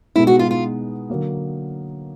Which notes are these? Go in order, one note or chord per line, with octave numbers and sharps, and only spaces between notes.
B2 G#3 B3 D#4 E4
F#4
F4
F4
D3 F#3 A#3